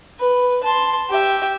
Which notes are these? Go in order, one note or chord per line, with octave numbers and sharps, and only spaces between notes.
B4
A5 C6
G4 E5